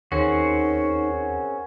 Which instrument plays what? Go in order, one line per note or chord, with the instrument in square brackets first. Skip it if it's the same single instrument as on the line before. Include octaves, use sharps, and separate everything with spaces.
[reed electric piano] D#2 [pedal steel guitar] C4 C#4 F#4 [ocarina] D#4 [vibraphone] G#4 A#4 C#5